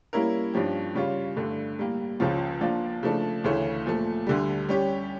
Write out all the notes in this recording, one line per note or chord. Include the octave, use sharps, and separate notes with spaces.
G3 A#3 C#4 E4 A#4
G2 F3 C#4 G4
C#3 G3 C#4 F4
G2 D3 A3
A2 G3 A#3
C#2 C#3 F3 C#4 F4
F3 A#3 D4 F4
C#3 F3 A3 D4
D2 C#3 E3 A3 C#4
A#2 F3 A3
D2 D3 G3
G3 C#4 G4